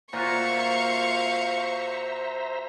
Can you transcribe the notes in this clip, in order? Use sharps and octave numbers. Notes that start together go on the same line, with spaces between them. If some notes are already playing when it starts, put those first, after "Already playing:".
A#2 F4 F#4 C5 E5 F5 A#5 C#6